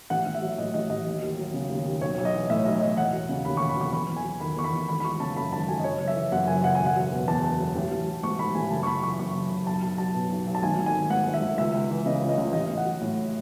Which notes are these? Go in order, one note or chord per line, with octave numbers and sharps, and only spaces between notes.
A1 F#5
A1
E5
F#3
A2 D#5
A1 D#5
A1 D#5
D#2
D#2
F#3
C#3
D#2
D#2
B1 C#5
B1
D#5
E3
A2 E5
B1 D#5
B1 D#5
E1 F#5
F#3
C#3
D#2 B5
C#6
E1
B5
F#3 C#6
E2 B5
E2
G#5
F#3
D#3 B5
E2 C#6
B5
E2
G#1 B5
B5
F#3 C#6
C#3 A5
F#2 B5
G#1 A5
F#3 G#5
D#5
F#1 C#5
F#1
E5
E3
F#2 F#5
F#1 G#5
F#1 F#5
E1 G#5
F#5
F#3
B2
E2 A5
E1
F#3
A1
A1
F#3
G#2 C#6
A1 B5
A1 G#5
F#1 A5
C#6
F#1 B5
E3 C#6
F#2 C#6
F#1
F#1
B1 A5
B1 A5
F#3 A5
B2
B1
B1
A5
G#1 G#5
G#1
G#5
D#3
G#2 F#5
G#1
E5
G#1
C#2 E5
C#2
E3
C#3 D#5
C#2
D#5
C#2
A1 D#5
A1
F#5
F#3
A2